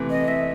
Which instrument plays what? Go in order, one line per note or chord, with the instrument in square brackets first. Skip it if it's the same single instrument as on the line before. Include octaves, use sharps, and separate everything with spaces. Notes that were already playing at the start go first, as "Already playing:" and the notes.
Already playing: [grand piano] C3 E3 A3
[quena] D#5
E5